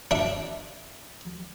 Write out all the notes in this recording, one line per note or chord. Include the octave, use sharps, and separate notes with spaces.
D4 E5